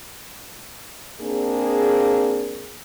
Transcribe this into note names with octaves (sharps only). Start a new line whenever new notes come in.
A#3 C4 D4 G#4